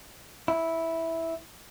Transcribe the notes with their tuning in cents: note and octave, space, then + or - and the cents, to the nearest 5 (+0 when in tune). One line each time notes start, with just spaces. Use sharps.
E4 -5